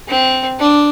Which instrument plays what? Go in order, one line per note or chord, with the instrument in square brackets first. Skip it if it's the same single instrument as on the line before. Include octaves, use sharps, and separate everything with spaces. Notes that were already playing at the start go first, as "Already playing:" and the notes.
[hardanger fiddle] C4
D4